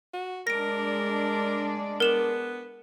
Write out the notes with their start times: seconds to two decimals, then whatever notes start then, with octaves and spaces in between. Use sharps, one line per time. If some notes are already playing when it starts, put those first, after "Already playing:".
0.13 F#4
0.47 G#3 D4 A#4 D5 A#6 D7
2.00 B3 A#4 E7 F#7